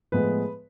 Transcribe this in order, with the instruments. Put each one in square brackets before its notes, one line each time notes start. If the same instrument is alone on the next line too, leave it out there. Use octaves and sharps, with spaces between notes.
[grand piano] A2 F3 G#3 B3 B4